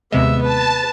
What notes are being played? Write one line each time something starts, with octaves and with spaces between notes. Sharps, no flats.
D#2 C3 G#3 B3 E5
B4 A5